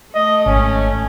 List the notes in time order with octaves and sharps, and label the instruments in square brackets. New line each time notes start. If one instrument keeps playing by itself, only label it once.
[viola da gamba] A3 [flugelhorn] D#5
[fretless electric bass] G#1 [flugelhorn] C#4